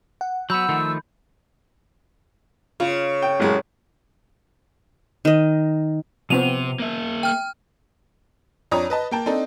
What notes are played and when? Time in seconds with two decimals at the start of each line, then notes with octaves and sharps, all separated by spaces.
0.21 F#5
0.50 F#3 B3 B5 E6 G6
0.69 D#3 F3 A3
2.80 C#3 F4
3.22 G5
3.40 A1 F#2 G#3
5.25 D#3 D#5
6.30 C3 F3 B3 C4 D#7 F7
6.80 A#3 E5
7.23 G5 F6
8.71 F2 D4 C#5 A#5 D#6
8.90 B4 D#5 A5
9.11 A#3 G5 A5
9.26 C4 D4 D#4 A4